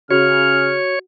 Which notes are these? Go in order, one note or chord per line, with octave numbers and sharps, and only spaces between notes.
C#3 F#4 C#5 F6